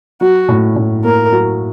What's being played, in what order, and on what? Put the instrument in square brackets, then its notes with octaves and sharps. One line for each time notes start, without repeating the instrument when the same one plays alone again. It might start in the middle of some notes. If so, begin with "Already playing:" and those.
[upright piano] F#3 [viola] F#4
[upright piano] A2
A2
[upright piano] A#3 [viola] A#4
[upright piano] F#3